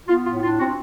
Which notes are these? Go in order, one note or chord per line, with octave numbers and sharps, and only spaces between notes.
B3 F4
A2 F4
D4 F4
C4 F#4